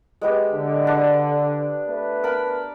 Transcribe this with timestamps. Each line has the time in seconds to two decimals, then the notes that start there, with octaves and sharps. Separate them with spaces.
0.21 G#3 B3 G4
0.52 D3
0.87 D4
1.87 A3 B3 B4
2.23 A#4 A5 B5